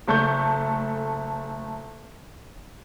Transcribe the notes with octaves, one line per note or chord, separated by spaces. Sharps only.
F#1 A3 A4 C#6 G6